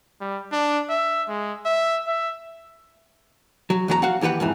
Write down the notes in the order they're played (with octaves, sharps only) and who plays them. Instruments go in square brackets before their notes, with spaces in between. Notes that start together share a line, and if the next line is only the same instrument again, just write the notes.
[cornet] G3
D4
E5
G#3
E5
E5
[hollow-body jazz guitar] F#3
E2 F#3 G#4 A#5
F#4 F5 F#5
D#2 E3 G4 B4 F#5
F2 G#2 E3